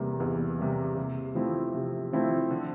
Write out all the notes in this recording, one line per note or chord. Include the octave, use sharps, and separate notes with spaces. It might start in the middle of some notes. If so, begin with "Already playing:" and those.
Already playing: E2 C3 G3 A#3
E2
C3 G3 A#3
C3
F3 A3 C4 E4
C3
F3 A3 C4 E4
D3